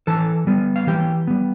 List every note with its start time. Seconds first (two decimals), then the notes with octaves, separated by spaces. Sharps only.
0.07 E3 A4 A5
0.47 G3 B3
0.76 F5
0.87 E3 G4 G5
1.27 G3 B3